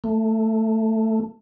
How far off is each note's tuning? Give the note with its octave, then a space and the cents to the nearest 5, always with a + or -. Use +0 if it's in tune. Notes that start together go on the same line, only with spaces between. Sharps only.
A3 +10